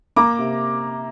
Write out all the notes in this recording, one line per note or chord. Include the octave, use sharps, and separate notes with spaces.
A#3 A#5 D6
C3